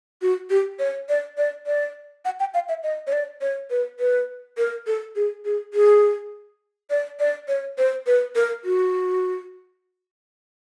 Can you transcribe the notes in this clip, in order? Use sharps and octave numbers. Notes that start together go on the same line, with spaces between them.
F#4
G4
C#5
D5
D5
D5
F#5
G5
F5
E5
D#5
C#5
D5
C#5
B4
B4
A#4
A4
G#4
G#4
G#4
D5
D5
C#5
C5
B4
A#4
F#4